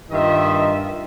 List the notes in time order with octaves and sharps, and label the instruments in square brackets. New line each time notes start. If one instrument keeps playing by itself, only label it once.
[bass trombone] G2 [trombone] D#3 [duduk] F4 [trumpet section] D#5 E5